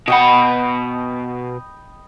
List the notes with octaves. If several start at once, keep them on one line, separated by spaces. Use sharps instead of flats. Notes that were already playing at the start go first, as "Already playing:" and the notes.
B2 D#5 F#5 G5 B5